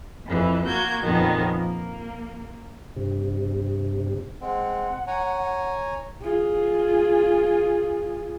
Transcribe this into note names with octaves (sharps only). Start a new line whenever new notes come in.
F2 E3
A#3 F#4 G6 G#6
F2 A#2 D#3 F3 B3
A#3
G2 C3
G#3 C4 F#5
C#5 G#5 A#5
F4 G#4